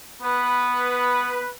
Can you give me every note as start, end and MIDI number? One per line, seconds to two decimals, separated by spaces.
0.23 1.41 59
0.23 1.51 71